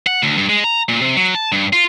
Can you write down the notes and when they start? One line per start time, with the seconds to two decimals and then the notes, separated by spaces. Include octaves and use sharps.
0.07 F#5
0.23 D2
0.38 G2
0.49 G#3
0.64 A#5
0.89 A#2
1.01 C3
1.16 F#3
1.35 A5
1.52 G2
1.73 F4